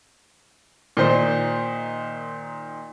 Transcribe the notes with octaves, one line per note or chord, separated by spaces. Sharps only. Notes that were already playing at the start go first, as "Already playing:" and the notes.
A#2 D#3 C5